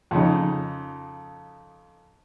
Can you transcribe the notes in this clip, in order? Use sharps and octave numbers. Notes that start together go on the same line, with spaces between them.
F2 C#3 D#4